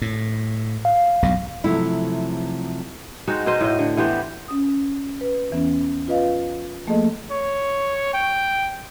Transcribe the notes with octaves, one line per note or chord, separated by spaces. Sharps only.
A2
F5
B1 G2
C3 F3 F#3 A3 E4
G#3 C4 D#4 F#4
B2 D#4 C5 D#5
A2 D#5
D3
E3 B3 G4 C5
C#4 D#6
B4
E2 E3 B3 C#4
F4 B4 D#5 F5
F3 A3 A#3 G#4 A4 D#5
C#5
G5